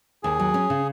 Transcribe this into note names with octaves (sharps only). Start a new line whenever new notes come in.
D#2 G#4
F#3
C#4
C#3